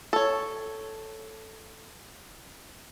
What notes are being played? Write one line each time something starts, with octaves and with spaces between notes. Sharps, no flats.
A4 C#5